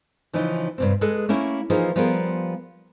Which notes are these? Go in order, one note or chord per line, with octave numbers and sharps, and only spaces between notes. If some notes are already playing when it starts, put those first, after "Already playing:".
C#3 E3 F3 D#4
G2 C3 C4
G#3 G#4 A4 B4
A3 A#3 C#4 E4 E5
E3 F3 A#3 D#4 F4 G#4
F3 G3 B3 F4 G#4 A#4